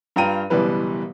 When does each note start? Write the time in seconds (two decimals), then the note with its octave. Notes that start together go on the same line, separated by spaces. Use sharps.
0.16 G2 F4 G5 A#5 D#7
0.50 F#1 B2 E3 G3 B4